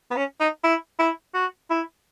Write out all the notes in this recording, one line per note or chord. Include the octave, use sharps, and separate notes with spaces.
B3
C#4
D#4
E4
E4
F#4
E4